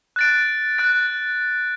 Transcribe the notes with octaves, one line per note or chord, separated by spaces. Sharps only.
F#6 A6 D7
F#6 A6 D7